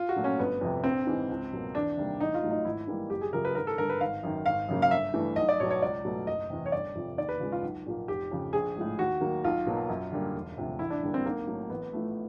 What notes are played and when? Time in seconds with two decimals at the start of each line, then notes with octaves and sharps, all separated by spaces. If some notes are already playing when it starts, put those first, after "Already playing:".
Already playing: F4
0.09 F#4
0.16 A#2 F#3 A3
0.24 C#4
0.40 G1 B3
0.61 F2 C3
0.84 A#1 C4
1.07 G#2 E3 G#3
1.29 C#2
1.53 B2 F#3 A#3
1.75 E2 D4
1.97 C3 D#3 G3 A#3
2.20 A1 D#4
2.34 F4
2.42 A2 F#3 A3
2.51 D#4
2.65 G#1 E4
2.87 G#2 E3 G3 A#3
3.10 F#1 G4
3.21 G#4
3.33 F#2 C#3 F3 A#4
3.45 B4
3.55 G#1 A#4
3.67 A4
3.78 G2 D3 A#4
3.90 B4
4.00 G#1 F5
4.23 F#2 D#3
4.46 G#1 F5
4.68 F#2 C#3 F#3 A#3
4.82 F5
4.91 G1 E5
5.14 G2 E3 A3
5.36 B1 D#5
5.49 D5
5.60 B2 C#5
5.63 F#3
5.70 C#5
5.82 C#2 D5
6.05 B2 F#3 A3
6.27 F#1 D#5
6.50 E2 C3
6.66 C#5
6.72 G1 D5
6.95 F2 C3 F3
7.18 D#2 D5
7.29 B4
7.40 C#3 F3 G#3
7.52 F4
7.62 B1
7.86 A#2 F3 A#3
8.08 F1 G4
8.31 F2 C#3
8.53 A#1 G#4
8.76 A2 F3 G#3
8.99 D#2 F#4
9.21 D#3 F#3 A#3
9.44 B1 F4
9.67 B2 F#3 A#3
9.89 F#2
10.12 D3 G3 A#3
10.34 E1
10.57 D2 C3 F3
10.79 A1 E4
10.90 D4
11.02 G2 D3 G3 A#3
11.14 C4
11.24 B1 A#3
11.47 A2 F#3
11.70 A1 B3
11.93 A2 F3 A3